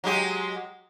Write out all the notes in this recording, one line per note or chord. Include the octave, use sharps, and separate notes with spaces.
F#3 G#3 G4